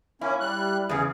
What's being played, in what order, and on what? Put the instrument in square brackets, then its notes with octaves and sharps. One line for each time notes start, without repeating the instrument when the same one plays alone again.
[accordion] A#3 C#4 [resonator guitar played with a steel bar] E4
[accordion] G3 F#6
[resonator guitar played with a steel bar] E2 C#3 [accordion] G#4